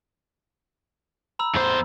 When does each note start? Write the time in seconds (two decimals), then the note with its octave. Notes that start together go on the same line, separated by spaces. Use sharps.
1.39 A#5 B5 E6
1.55 E2 C5